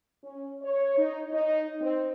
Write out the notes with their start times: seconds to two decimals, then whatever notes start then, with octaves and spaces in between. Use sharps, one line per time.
0.23 C#4
0.62 C#5
0.97 D#4
1.31 D#4
1.81 C4